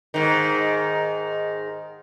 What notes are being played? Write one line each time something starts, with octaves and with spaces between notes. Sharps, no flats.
G#2 D#3